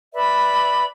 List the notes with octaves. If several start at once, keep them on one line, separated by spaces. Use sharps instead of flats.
B4 D5 E5 B5